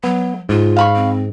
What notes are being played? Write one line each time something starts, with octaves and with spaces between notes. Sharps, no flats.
F#3 B3
G#2 F4
F5 B5 C#6
C4